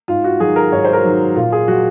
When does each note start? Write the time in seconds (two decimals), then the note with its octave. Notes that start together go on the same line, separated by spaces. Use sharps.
0.08 G#2 F4
0.24 F#4
0.40 D#3 F#3 G#4
0.56 A#4
0.72 G#2 C#5
0.85 C5
0.93 A#4
1.04 D#3 F#3
1.36 A#2 F4
1.52 G#4
1.68 F#3 F#4